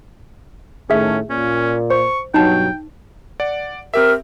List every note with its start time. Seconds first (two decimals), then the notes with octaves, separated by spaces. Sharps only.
0.90 A2 D#3 A3 C#4 G#4 E5
1.30 A#2 C#4
1.90 C5 C#6
2.34 G2 B2 F#3 D#4 G5 A5
3.40 D5 F#5
3.94 C4 G4 A#4 E5